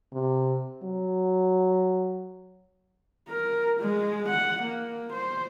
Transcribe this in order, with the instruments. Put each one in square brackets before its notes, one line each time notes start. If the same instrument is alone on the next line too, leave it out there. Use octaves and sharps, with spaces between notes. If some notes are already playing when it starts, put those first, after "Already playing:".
[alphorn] C3
F#3
[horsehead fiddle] A#4
G#3
F#5
A#3
C5